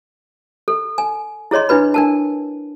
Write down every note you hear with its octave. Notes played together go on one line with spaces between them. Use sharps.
A4
G#5
E4 G#4 C#5 D#5 C6
D4 E4 B4 B5
D4 A#4 A5